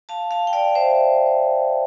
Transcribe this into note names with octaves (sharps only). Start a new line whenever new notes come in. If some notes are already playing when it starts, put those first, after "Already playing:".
F5 A5
F5 A5
G5
D5 F5
C5 E5